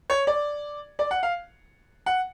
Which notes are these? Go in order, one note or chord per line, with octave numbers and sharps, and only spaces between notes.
C#5
D5
D5
F#5
F5
F#5